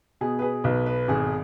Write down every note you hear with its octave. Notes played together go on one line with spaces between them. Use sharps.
B2 G#4
B4
G#4
B1 B4
B4
G#1 G#4